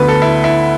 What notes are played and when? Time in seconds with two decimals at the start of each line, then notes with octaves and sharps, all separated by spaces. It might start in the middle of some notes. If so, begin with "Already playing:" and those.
Already playing: D2 D3 B3 B4
0.08 A4
0.22 E4
0.44 E4